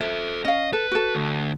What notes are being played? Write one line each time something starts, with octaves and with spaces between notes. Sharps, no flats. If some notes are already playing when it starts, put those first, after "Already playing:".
A4 C5 E5
C#4 D#5 F5
A4 B4
F#4 A4
D2